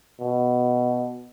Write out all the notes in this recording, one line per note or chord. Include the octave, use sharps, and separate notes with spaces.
B2